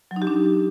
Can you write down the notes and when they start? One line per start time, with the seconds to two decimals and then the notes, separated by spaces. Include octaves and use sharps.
0.11 F#3
0.16 D#4
0.22 G4
0.27 D4